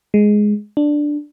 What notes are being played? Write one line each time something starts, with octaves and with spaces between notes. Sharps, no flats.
G#3
D4